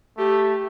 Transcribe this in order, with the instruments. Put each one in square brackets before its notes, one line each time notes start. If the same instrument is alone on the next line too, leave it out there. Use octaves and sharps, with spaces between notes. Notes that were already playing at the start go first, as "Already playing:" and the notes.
[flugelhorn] A3 [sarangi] G4